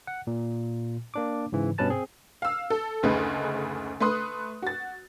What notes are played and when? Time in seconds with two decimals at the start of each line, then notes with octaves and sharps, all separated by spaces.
0.07 F#5
0.27 A#2
1.14 A#3 D4 D6
1.52 G#2 C#3 E3
1.78 G2 B2 C#4 B4 A5 A6
1.90 C4 G#4
2.42 F5 E6
2.70 A4
3.03 F#1 D2 C#3 A3 D#4 B4
4.00 A3 B4 C6 D#6 F#6
4.62 F#4 A6